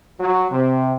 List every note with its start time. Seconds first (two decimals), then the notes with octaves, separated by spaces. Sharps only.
0.20 F#3
0.51 C3